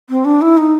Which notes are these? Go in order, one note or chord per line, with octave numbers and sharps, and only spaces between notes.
C4
D4
E4
D#4